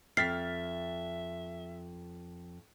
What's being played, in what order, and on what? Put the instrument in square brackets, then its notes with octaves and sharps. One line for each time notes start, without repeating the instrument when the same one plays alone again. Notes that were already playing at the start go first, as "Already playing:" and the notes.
[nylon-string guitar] F2 [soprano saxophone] E5 [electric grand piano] F6 A6 B6 [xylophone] C7